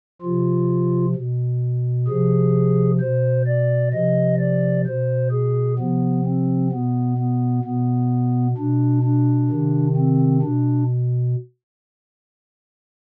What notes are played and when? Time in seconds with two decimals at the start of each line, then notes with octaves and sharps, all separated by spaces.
0.22 C3 F3 F4
1.15 B2
2.08 C3 F3 G#4
3.00 B2 C5
3.47 D5
3.93 C3 F3 D#5
4.40 D5
4.86 B2 C5
5.32 G#4
5.79 C3 F3 B3
6.25 C4
6.71 B2 B3
7.18 B3
7.64 B2 B3
8.57 B2 D4
9.04 D4
9.50 C3 D#3
9.96 C4
10.42 B2 D4